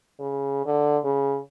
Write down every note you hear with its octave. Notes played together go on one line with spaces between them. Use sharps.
C#3
D3
C#3